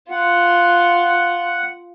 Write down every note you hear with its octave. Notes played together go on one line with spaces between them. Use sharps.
F4 F#5